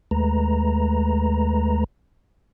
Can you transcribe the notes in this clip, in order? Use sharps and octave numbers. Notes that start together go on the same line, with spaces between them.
D#2 G#3 A3 B4 A#5